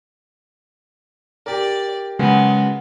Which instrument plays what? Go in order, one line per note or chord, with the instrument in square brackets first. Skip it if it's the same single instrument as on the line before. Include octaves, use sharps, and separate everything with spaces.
[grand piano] G4 A#4 [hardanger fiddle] D5
[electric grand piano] C#3 F#3 G#3 [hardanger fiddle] B3